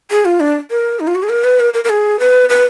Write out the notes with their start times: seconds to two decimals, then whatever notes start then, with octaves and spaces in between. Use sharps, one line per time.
0.11 G#4
0.25 F4
0.40 D4
0.71 A#4
1.00 D#4
1.07 F4
1.15 F#4
1.23 G#4
1.29 A#4
1.44 B4
1.60 A#4
1.74 A#4
1.84 A#4
1.90 G#4
2.20 B4
2.49 B4